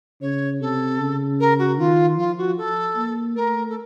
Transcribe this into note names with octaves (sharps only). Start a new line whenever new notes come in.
C#3 C#5
C3 A4
C#3
A#4
F#4
D#3 F4
F3 F4
F#4
A4
A#3
A3 A#4
A4